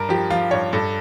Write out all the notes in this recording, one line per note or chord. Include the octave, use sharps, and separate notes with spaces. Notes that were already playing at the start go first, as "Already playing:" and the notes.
Already playing: G2 A#4
F3 G4
F3 F4
G2 C#5
G2 A4